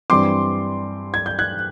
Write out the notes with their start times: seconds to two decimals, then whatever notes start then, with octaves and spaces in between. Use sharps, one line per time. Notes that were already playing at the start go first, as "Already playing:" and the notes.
0.10 G2 E3 G3 C4 C6 D6
1.14 G#6
1.26 G6
1.39 F#6 G#6